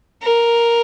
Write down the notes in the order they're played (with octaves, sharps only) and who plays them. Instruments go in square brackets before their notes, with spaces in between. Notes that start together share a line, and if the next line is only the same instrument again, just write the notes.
[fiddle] A#4